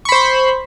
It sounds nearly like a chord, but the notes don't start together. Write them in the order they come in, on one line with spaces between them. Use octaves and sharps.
C#6 B5 C5